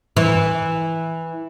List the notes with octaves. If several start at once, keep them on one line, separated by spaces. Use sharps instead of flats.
E3